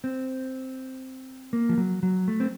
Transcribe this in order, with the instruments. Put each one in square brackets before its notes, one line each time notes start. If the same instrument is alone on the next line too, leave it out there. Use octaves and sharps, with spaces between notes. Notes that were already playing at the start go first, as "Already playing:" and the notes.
[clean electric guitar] C4
A#3
F3
F#3
F#3
A3
C4